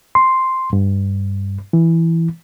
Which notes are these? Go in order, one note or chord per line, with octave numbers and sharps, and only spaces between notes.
C6
G2
E3